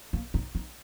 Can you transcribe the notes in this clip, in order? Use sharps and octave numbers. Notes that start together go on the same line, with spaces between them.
A#3
D#4
D#4